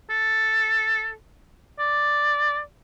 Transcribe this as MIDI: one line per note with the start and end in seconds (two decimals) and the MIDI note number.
0.10 1.12 69
1.79 2.59 74